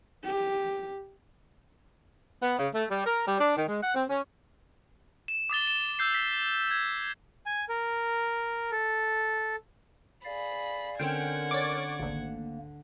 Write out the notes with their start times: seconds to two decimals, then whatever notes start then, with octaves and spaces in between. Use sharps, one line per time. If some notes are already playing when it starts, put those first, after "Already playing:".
0.24 G4
2.42 B3
2.59 C#3
2.73 A3
2.90 G3
3.05 A#4
3.26 G3
3.39 D4
3.56 D#3
3.67 G#3
3.82 F#5
3.95 C4
4.09 C#4
5.28 E7
5.50 D6 D#6 A6 G7
5.67 E7
5.99 E6 G6 C7
6.14 B6
6.71 G#6
7.46 G#5
7.69 A#4
8.71 A4
10.25 G#4 D5 F5 B5
10.99 D3 C4 C#4 A#4 F#5 G5 G#6
11.51 C#5 D5 D6
12.00 G#1 D2 A#3